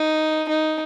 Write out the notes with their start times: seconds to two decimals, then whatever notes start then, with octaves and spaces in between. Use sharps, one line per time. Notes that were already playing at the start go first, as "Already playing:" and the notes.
Already playing: D#4
0.48 D#4